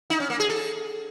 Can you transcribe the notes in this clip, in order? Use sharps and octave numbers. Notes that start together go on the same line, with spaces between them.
D#4
C#4
A#3
G#4
A4